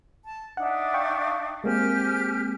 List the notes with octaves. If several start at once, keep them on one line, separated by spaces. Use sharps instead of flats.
A5
D4 D#4 E5 F#5
F5 G5 C#6
G#3 A#3 C4 G4 G#5 F6